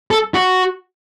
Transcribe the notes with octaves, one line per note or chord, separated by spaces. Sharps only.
A4
F#4